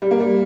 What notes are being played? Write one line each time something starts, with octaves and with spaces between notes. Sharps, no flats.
G3
A#3
G3